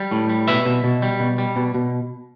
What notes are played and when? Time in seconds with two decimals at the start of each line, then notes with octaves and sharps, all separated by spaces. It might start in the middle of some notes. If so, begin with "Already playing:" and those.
Already playing: G3
0.11 A2
0.30 G3
0.48 B2 B4 E5
0.66 B2
0.84 B2
1.02 G3
1.20 B2
1.38 G3
1.56 B2
1.75 B2